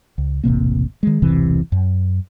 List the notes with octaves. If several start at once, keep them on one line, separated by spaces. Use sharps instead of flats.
C#2
E1 A1 C3 A#3
D#3 G#3
E1 C2 C3 E3
F#2